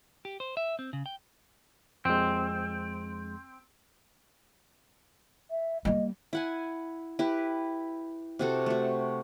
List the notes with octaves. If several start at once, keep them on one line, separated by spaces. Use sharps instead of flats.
G4
C5
E5
C4
C#3
G5
F2 G#3 C4
E5
G3 A#3 D#5
E4 F#5 G#5
E4 G4 B4
C3 F#4 A4
A3 F#4